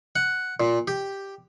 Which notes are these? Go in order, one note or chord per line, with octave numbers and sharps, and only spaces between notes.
F#5
A#2
G4